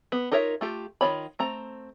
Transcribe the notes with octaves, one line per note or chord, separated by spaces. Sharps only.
B3
D#4 F4 A#4 C#5 E5
A3 F4 G4
D#3 D4 F4 C#5 B5
A3 C4 A#5